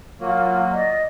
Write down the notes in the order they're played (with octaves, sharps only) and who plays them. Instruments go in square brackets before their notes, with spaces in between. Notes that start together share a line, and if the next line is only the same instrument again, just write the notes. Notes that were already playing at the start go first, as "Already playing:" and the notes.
[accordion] F#3 A#3 [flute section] F4
[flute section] D5 D#5